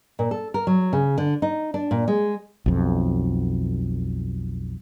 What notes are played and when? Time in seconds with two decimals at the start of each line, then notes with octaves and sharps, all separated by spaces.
0.19 A#2
0.31 A4
0.54 A#4
0.67 F#3
0.93 C#3
1.18 D3
1.42 D#4
1.74 D4
1.91 A#2
2.08 G#3
2.66 B1 F2